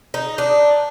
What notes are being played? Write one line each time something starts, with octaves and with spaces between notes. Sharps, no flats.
D#4
D4